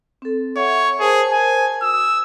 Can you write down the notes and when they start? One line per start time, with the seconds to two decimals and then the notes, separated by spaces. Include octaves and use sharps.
0.22 C4 A4
0.56 C#5 E5 F#5
1.00 G#4 A#4 C5 A5
1.32 G#5
1.82 F#4 D#6 E6